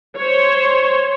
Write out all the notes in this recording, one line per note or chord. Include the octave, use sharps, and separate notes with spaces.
C5 C#5